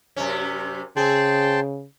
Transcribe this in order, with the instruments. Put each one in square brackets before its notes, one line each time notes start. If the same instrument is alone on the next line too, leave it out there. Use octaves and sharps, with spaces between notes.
[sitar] F#2 C3 C#4
[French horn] C#3 [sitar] C4 G#4 [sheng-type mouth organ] G5 A5 C6